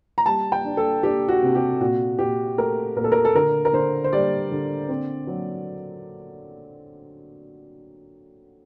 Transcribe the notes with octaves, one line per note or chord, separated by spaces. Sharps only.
A#5
G3 A5
G5
D4
A4
D4 G4
F#4
C3
G4
A#2 F#4
A#2 G4
A3 A#4
A#2 A#4
A4
A#4
A4
D3 A#4
A#4
D3 C5
C5
G3 D5
D3
C4
F#3